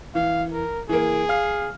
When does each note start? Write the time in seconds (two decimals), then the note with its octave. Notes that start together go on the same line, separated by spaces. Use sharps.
0.15 E3 F5
0.52 A#4
0.89 E3 A#3 G#4
1.29 F5 F6